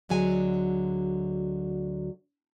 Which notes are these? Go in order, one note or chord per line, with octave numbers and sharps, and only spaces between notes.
D2 D3 F#3 G#3 G#5